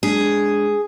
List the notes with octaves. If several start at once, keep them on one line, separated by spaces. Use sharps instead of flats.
G#3 D4 G#4